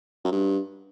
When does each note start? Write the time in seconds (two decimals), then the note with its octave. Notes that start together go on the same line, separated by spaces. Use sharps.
0.25 F#2
0.32 G2